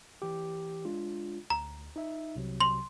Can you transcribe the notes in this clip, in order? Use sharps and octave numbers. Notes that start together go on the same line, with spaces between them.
E3 G4
G#3 D4 F4
D2 A#5
D#4 E5
C2 C3 F#3
C6 F#7